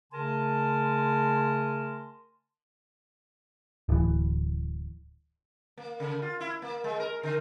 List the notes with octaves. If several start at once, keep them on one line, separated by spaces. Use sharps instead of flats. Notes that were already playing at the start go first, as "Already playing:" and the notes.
C#3 A3 A#4 G#5 A5 C6
D1 E3
A#3
C#3
F4
E4
A#3
G#3
A#4
D3